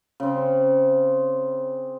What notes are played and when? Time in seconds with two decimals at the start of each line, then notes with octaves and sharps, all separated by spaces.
0.20 C#3 C4